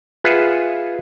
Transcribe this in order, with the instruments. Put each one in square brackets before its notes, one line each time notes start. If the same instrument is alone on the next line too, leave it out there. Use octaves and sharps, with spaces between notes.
[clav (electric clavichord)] F4 G#4 B4 E5 F#5